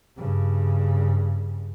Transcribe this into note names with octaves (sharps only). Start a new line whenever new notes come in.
G2 C#3